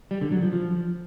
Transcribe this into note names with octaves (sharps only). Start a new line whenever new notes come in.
G3
D3
F#3
F3
F3